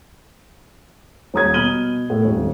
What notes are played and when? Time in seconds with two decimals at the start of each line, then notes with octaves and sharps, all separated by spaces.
1.34 D#1 C#5 A#5 D#6 G6 G#6
1.54 B2 B5 F6 D#7 F#7 G7
2.10 A2 A3
2.25 D#1 G#1